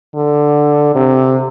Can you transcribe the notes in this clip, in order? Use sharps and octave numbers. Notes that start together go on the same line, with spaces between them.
D3
C3